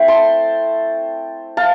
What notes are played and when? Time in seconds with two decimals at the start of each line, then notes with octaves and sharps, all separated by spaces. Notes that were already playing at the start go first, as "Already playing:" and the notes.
Already playing: A3 C4 E4 G5
0.08 A5 C6
1.57 F5 A5